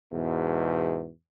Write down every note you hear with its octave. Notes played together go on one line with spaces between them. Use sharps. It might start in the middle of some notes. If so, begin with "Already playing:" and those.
E2 G#2 B2